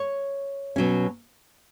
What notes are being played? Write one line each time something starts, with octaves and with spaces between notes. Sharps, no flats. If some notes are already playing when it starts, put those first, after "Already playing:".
Already playing: C#5
B2 F#3 C#4